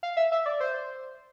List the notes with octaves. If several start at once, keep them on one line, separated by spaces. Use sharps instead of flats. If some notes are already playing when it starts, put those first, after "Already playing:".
F5
E5
E5
D5
C5